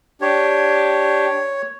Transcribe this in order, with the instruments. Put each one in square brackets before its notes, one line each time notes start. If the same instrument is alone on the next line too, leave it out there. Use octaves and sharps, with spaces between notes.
[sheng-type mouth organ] D4 G4 [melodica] C#5